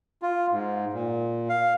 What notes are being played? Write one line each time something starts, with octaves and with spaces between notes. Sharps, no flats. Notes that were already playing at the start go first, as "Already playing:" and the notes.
F4
G#2
A#2
F5